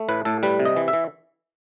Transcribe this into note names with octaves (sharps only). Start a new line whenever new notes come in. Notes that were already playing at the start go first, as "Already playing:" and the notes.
Already playing: A3
A2 B4
A2 A4
G3 B4
C3
D#5
E3
E5
E3